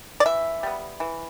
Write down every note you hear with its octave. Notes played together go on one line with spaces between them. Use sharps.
D5
E3 E5
G3 B3
E3